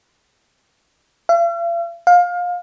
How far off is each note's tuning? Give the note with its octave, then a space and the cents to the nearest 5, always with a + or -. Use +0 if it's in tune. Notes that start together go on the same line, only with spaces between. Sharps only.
F5 -45
F5 +25